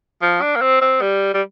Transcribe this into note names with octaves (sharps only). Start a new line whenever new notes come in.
F3
D4
A#3
C4
C4
G3
G3